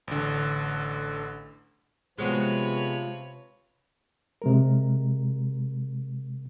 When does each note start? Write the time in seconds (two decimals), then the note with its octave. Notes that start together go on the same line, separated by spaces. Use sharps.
0.07 A1 D3
2.18 C3 F3 G#3 B3 F#4 B4 C#5
4.42 C3 G#3 A#4